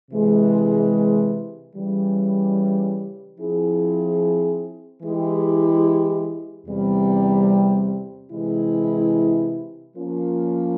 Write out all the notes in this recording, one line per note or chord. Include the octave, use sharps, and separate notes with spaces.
C3 E3 G#3
C#3 E3 G3
F3 C4 E4 G#4
E3 G#3 E4 G4
E2 C3 G3 C4
C3 E3 G#3 E4
F3 A#3 C#4 F4 A#4